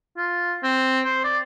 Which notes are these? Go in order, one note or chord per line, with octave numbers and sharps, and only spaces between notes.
F4
C4
C5
D5